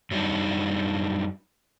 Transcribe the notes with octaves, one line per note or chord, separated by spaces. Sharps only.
F#2 F#3 G3 D4 D#4